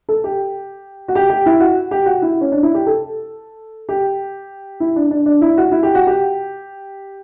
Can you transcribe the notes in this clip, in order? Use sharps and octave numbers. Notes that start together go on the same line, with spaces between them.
A4
G4
F#4
G4
G4
E4
F#4
G4
F#4
E4
C#4
D4
E4
G4
A4
G4
E4
D4
D4
D4
E4
F#4
E4
G4
F#4
G4